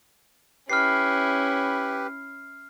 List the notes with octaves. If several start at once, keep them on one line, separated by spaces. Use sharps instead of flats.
C#4 E4 G4 B4 F6 C7